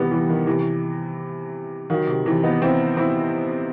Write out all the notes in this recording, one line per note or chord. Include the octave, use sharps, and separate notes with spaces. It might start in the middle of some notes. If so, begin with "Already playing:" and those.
Already playing: C3 D#3 E3 G3 B3
E3 G3
D#3
C3 E3
D#3 F#3
C3
C3 E3
B3 D#4
C4 E4
C4 E4